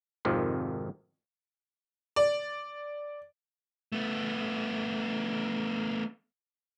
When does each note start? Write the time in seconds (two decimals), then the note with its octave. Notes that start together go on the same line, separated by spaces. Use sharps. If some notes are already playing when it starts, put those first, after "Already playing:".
0.25 G#1 F2 C3 D#3 F3
2.16 D5
3.92 A3 B3